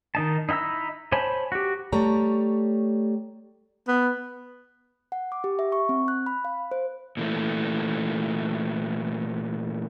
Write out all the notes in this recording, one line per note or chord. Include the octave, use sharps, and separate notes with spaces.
D#3 D#4 A5
D#4 E4 G5 A#5 E6
C5 C#5 G#5 A5 B5
F#4 G4
G3 A3 C#5 A#5
B3
F#5
D6
G4
E5
C#6
C4
F#6
B5
F5
C5
A#2 E3 A3